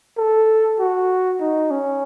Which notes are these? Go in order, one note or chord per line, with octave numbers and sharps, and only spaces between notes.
A4
F#4
D#4
C#4